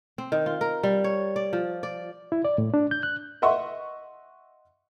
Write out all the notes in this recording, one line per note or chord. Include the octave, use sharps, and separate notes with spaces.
C4
D#3
F4
A#4
G3
C#5
D5
F3
D5
E4
D5
A2
D4
G6
F#6
D#5 E5 F#5 C6 C#6